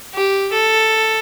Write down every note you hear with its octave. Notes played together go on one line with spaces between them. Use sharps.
G4
A4